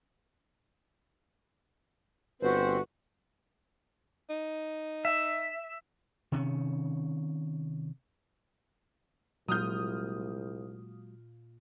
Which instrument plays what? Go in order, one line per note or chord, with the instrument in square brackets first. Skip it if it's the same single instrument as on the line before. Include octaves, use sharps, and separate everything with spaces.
[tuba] G1 [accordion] C4 C5 [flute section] F#4 B4
[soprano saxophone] D#4
[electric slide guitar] E5
[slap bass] C3 D#3 C#4
[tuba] C2 [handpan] A#2 F4 [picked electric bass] F#3 G#3 [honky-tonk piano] D#6 F6 G6